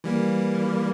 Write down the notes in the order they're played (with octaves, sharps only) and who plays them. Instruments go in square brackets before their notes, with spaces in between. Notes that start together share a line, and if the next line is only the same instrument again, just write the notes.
[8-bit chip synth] E3 G3 A#3